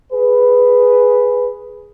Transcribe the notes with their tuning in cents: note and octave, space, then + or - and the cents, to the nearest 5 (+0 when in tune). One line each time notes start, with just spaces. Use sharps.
G#4 +0 B4 +0